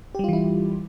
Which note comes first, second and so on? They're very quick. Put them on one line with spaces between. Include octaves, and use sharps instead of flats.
G4 G3 F4 E3 E4